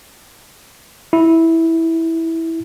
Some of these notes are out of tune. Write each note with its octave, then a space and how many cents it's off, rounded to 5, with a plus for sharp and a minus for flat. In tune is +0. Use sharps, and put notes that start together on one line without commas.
E4 -10